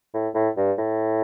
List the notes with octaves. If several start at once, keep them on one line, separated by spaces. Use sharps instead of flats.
A2
A2
G2
A2